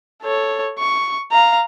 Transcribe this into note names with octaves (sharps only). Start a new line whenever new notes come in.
A4 C#5
C#6
F5 A#5